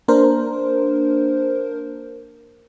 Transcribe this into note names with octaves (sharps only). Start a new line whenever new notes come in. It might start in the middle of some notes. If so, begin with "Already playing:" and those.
A#3 D4 A#4 C5